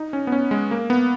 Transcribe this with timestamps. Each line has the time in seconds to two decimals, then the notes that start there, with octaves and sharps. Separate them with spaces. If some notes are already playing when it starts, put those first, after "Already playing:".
Already playing: D#4
0.13 C#4
0.27 B3
0.32 C#4
0.51 G#3
0.71 A#3
0.90 B3